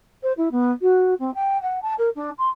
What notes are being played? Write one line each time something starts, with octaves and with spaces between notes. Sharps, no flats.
C5
E4
B3
F#4
C4
G5
F#5
A5
A#4
D4
C6